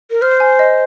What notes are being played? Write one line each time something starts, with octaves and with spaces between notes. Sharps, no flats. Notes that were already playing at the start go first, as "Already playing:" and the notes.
A#4
C5 F6
G#5
D#5